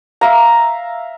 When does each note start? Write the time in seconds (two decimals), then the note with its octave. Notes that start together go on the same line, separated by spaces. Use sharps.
0.21 E5 F5 A#5